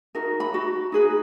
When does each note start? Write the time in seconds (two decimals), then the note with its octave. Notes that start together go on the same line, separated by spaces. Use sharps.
0.15 D#4 F#4 A#4
0.40 B5
0.53 D#4 F#4
0.92 D#4 G#4 B4